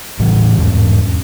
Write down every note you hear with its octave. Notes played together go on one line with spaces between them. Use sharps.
A2 E3 G3
E2 G#2